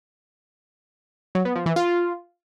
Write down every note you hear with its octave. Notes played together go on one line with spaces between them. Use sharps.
F#3
B3
F3
E3
F4